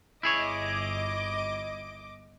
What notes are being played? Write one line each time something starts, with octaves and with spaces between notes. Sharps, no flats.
G1 E4 G#4 C#5 D#5 D6